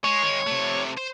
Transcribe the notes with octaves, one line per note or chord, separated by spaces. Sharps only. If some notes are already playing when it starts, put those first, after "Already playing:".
G#3 C#5
D#3 G#3
C3 A3
C5